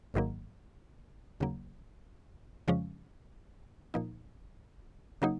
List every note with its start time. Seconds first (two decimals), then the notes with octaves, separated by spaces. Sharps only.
0.14 G#1 G#2 D#3 F#3 A#3
1.40 D#2 C#3 F#3 A#3
2.68 F2 C#3 F3 G#3 C#4
3.94 A#2 F3 A#3 D#4
5.22 C#3 F#3 A#3 D#4